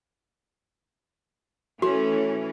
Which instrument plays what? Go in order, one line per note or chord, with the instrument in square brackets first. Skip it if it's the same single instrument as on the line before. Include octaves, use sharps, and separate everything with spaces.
[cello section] E3 C#4 [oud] A3 [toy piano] F#4